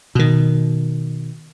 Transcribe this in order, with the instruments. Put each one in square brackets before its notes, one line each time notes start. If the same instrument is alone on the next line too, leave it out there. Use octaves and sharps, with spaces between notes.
[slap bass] B2 D#3